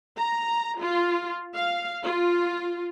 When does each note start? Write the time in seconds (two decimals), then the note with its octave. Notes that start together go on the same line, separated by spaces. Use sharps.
0.18 A#5
0.81 F4
1.56 F5
2.04 F4